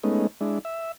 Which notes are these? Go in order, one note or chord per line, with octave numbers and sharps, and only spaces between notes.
G#3 A3 B3 C#4 D#4
G#3 D4 E4
E5